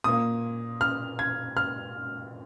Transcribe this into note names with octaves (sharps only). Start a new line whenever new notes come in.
A#2 A#3 D#6
F6
G#6
F6